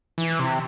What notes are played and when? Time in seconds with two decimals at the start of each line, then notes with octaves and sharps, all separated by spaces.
0.18 E3
0.39 C3